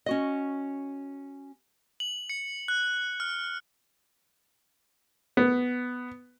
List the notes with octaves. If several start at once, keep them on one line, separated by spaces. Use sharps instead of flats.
C#4 F#4 D#5
F#7
C#7
F#6
F6
B3